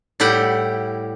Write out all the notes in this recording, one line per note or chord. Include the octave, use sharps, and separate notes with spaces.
A2 G3 E4 G4 F#5 G5